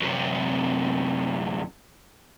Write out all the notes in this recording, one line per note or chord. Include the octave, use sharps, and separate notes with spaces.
F#2 C3